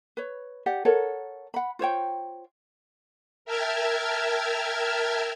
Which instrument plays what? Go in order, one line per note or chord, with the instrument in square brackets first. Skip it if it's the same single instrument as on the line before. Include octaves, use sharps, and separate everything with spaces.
[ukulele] B4 C#5
G4 D5 F#5
A4 A#4 C#5 F#5
F#5 B5
F4 C5 C#5 G5
[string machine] A#4 E5 G5 A5 F6 G#6